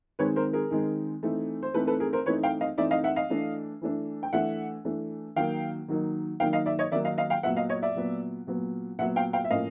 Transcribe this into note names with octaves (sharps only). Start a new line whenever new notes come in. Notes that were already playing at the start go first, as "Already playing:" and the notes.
D#3 G#3 C4 D#4 B4 C#5
A#4 C5
G#4 A#4
D#3 G#3 C4 D#4
E3 A3 C4 D#4
C5
E3 A3 C4 D#4 A4 B4
A4 B4
G#4 A#4
A#4 C5
E3 A3 C4 D#4 B4 C#5
F5 G5
D#5 F5
E3 A3 C4 D#4 D5 E5
D#5 F5
E5 F#5
D#5 F5
E3 A3 D4
E3 A3 D4
G5
E3 A3 D4 E5 F#5
E3 A3 D4
D#3 F#3 A#3 D#4 F5 G5
D#3 F#3 A#3 D#4
D#3 F#3 A#3 D#4 F5 G5
D#5 F5
D5 E5
C#5 D#5
D#3 F#3 A#3 D#4 D5 E5
D#5 F5
D#5 F5
F5 G5
A#2 F#3 B3 E5 F#5
D#5 F5
C#5 D#5
D5 E5
A#2 F#3 B3
A#2 F#3 B3
A#2 F#3 B3 E5 F#5
F5 G5
F5 G5
E5
A2 F3 A#3 C#4 D#5 F5